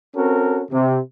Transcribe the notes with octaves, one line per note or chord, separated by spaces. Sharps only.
C4 C#4 F#4 A4 A#4
C3